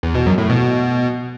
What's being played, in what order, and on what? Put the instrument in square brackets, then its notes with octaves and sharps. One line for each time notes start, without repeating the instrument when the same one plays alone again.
[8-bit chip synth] E2
B2
F#2
A2
B2